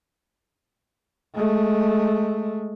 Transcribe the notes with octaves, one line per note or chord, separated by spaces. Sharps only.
G#3 A3